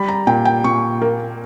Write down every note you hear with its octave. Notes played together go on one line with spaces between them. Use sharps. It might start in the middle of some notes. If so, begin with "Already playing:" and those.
Already playing: G3 B5
A#5
A#2 G5
G5
A#2 C#6
A#3